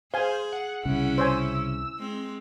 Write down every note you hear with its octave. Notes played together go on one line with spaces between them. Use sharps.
G#4 C5 F5 G#5
F#5
C2 C#3 C#4 E4
C5 C#5 G#5 E6
G#3 C4